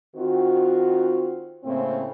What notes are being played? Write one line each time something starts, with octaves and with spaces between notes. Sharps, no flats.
D#3 C4 F4 F#4
A2 C#3 A#3 C4